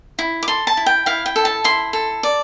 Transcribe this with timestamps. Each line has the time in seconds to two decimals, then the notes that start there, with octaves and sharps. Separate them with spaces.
0.19 E4
0.43 D6
0.48 A4 C6
0.67 A5
0.77 E4
0.86 G5
1.06 E4 F5
1.26 G5
1.36 A4
1.45 A5
1.64 E4 C6
1.93 A4
2.23 D5